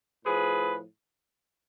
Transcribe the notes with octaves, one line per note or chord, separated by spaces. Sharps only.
A2 F3 G#4 B4